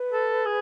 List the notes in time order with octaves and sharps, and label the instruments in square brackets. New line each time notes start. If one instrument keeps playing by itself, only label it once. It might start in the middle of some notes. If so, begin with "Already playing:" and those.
Already playing: [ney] B4
[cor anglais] A4
G#4